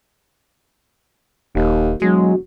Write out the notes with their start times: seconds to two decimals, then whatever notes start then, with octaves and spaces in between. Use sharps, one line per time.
1.55 D#1 D#2
2.02 E1 F#3 G#3